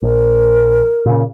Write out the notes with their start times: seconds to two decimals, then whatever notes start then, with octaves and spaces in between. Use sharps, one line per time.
0.02 A#1 A#4
1.06 A#2 C#3